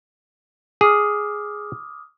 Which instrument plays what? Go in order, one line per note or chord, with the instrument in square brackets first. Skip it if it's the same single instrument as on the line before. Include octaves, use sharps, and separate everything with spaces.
[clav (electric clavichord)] G#4 [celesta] D6 D#6 F6